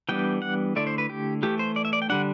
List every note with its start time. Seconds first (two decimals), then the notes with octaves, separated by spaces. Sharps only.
0.09 E3 G3 B3 D4 G5
0.42 F#5
0.76 D3 A3 E4 D5
0.87 C5
0.98 B4
1.10 G4
1.43 E3 A3 E4 G4
1.59 C5
1.76 D5
1.85 E5
1.93 D5
2.02 G5
2.09 D3 G3 D4 F#5